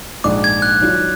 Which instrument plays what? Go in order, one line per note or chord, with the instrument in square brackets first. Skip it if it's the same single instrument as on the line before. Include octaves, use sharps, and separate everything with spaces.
[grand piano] A#1 G#2 F3 G#3 D4 [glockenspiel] D6
[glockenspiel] G#6
F#6
[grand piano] D#3 F#3 D4 F4